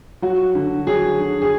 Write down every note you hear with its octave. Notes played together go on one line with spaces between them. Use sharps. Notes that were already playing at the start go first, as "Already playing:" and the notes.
F#3 F#4
D3
F#3 G#4
D3
G#4